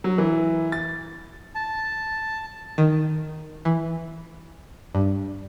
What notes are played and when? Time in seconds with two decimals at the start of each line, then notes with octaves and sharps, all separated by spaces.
0.04 F#3
0.18 E3
0.72 A6
1.55 A5
2.78 D#3
3.65 E3
4.95 G2